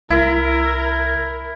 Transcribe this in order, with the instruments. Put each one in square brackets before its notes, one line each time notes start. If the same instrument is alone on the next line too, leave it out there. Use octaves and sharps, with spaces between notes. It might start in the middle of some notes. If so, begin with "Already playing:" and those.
[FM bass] C2 [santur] E4 [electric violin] A#4